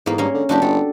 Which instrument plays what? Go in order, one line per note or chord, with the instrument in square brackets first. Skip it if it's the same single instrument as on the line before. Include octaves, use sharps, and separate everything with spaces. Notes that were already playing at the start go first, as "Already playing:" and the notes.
[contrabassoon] E2 [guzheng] G#2 A#3
[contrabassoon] G2 [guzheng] A#3 C#4
[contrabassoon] D3
[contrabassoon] F#1 [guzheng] D4 F#4 G4
[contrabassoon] G1 [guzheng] A4